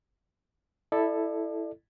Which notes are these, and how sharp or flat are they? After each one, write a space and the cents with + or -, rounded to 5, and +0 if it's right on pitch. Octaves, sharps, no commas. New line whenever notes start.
E4 +0 A4 +0 D5 +35